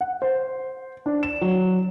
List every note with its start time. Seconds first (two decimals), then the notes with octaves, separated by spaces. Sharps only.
0.01 F#5
0.22 C5
1.06 D4
1.23 E7
1.41 F#3